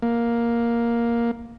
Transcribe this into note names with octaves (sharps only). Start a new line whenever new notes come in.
A#3